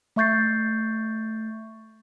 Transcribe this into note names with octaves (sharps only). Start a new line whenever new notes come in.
A3 E5 C#6 G6 A6 C7